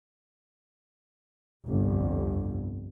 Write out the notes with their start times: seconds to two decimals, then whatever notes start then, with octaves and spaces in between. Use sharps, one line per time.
1.65 G1 C2 F2